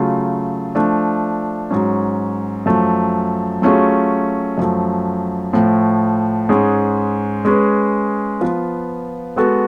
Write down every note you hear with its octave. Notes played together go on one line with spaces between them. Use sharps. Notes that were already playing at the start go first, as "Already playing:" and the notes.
Already playing: C#3 F#3 A3 F4
F3 A3 D4
G#2 F#3 C#4
F#2 F3 A3
F#3 A3 C#4 F4 G#4
F#2 F3 A3
A2 F3 A3
G#2 G#3 C#4 G#4
G#3 C#4 G#4 B4
F3 B3 F4 B4
G#3 B3 F#4 A4